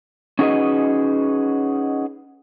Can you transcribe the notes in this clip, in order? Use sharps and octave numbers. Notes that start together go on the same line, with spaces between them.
C#4 D#4 F#4 G#4 B4 D#5